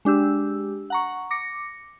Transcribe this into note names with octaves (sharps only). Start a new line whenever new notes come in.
G#3 D4 G4 E6
F#5 A#5 C#6
D6 A#6 C#7